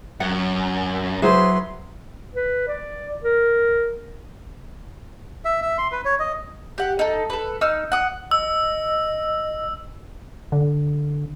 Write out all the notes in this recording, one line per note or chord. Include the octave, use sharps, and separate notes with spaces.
F#2 F#5
F#3 E4 G#4 B4 C5 C6
B4
D5
A#4
E5
E5
C6
B4
C#5
D#5
G4 F#5
D#4 A4
A4 B4
D#4 E6 F6
F#5 D#6
D#5 E6
D3